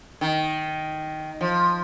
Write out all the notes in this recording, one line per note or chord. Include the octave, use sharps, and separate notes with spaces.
D#3
F3